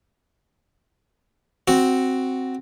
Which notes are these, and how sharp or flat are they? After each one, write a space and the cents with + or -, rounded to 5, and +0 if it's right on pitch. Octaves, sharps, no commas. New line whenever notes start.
C4 +0 F#4 +0